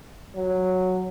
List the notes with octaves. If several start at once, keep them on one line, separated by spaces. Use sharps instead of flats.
F#3